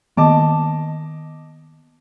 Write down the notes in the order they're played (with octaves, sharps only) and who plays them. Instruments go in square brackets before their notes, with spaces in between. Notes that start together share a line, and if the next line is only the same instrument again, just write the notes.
[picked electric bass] D#3 A#3 B3 [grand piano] D#5 A5 D6